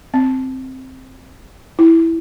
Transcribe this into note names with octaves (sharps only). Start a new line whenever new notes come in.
C4
E4